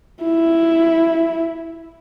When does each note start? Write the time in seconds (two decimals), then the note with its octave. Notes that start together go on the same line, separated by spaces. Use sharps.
0.23 E4